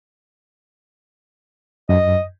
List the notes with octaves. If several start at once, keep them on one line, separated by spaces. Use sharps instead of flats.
F#2 D#5